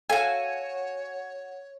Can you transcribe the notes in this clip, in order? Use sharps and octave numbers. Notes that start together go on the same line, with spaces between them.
F#4 A4 C#5 E5 F5 G#5